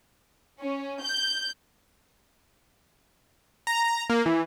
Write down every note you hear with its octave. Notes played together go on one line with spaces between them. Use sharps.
C#4
G6
A#5
A#3
E3